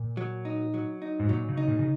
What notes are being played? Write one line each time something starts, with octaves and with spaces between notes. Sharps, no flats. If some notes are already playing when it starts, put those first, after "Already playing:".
Already playing: A#2
F#3
D#4
F#3
D#4
G#2
A#2 F#3
C#3
D#4
A#2
C#3